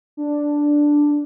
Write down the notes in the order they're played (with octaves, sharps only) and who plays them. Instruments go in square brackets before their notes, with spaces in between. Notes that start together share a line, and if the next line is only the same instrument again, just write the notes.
[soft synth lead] D4